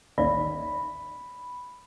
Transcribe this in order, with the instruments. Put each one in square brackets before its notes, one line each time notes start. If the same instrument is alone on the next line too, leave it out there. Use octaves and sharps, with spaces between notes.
[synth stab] A1 D#2 [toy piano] D5 E5 [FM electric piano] B5